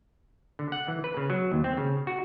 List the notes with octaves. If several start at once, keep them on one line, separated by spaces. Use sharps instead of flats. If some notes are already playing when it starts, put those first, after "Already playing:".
D3
F#5
E3
B4
C#3
F#3
D#2
C4
C#3
F#4